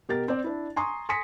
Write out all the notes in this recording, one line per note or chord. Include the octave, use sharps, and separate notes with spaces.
B2 G4 A#4 A6
C4 D5
D4 E4
G#5 A#5 C6 C#6 D#6
G#5 C6 D#6 A#6 B6 C#7